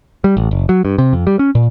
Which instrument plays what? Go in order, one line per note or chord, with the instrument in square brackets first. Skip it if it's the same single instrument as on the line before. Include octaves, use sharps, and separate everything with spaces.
[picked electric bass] G3
A1
F#1
F#3
G2
C3
F2
G3
C#4
A#2